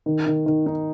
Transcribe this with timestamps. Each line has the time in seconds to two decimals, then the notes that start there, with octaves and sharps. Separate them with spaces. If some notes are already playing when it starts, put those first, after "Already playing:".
0.06 D#3
0.26 D#3
0.46 D#3
0.66 D#4